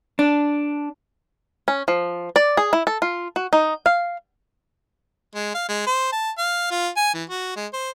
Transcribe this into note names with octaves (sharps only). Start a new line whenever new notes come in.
D4
C#4
F3
D5
G#4
E4
A4
F4
F#4
D#4
F5
G#3
F5
G#3
C5
A5
F5
F4
G#5
E3
F#4
G#3
C5